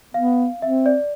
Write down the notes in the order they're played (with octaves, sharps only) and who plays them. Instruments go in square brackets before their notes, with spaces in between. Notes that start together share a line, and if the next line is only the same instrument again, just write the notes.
[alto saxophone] B3 [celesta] F5
[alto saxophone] C4 [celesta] E5
[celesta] D5